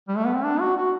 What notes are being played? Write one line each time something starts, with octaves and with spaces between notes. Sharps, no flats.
G3
A3
B3
C4
D4
F#4
F#4